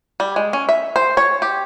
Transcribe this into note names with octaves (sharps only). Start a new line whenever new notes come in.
G3
G#3
C#4
E5
C5
C#5
G4